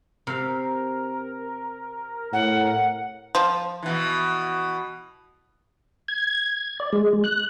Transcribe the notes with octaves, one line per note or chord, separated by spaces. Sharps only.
C3 A#4 F5
A2 F#5
F3
B2 E3
G#6
D5
G#3
F#6